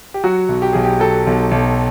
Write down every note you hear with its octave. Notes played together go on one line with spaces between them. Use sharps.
G4
F#3 F#4
B1
G4
B1 G#4
G4
F#3 A4
B1
B1